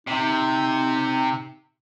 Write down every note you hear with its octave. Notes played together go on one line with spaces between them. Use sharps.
C3 D#4